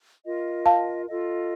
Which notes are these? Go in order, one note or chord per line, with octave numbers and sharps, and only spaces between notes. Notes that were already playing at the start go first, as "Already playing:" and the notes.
F4 A#4 D#5
F5 A5
F4 A4 D#5